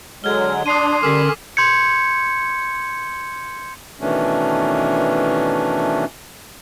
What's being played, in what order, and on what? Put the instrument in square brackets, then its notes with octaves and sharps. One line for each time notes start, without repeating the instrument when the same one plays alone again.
[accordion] D3 F#3 G#3 [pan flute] F6 [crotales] G#6 G7
[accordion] D4 [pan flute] C6 [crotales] D#6 C7 D#7
[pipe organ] D3 C#4 A#4 [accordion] G3 [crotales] D6 E6 B6
[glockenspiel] C6 G6 G#6 C#7
[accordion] B2 D#3 E3 A3 C#4 D4